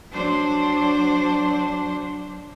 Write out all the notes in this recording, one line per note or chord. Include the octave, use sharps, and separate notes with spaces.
F#3 D4 C5